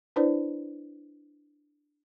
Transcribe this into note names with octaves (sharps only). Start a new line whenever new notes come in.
D4 E4 B4 C5 D5